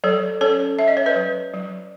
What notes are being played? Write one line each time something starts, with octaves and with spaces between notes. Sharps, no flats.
F#3 A4 C#5
C#4 A4 C#5
C#4 E5
D#5
C#5
B4 D#5
F#3
F#3